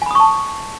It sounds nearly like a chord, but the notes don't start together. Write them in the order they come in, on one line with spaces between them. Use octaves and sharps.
G#5 B5 D#6 C#6 A5